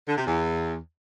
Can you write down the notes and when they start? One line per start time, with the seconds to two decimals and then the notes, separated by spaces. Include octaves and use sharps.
0.08 D3
0.17 C3
0.26 E2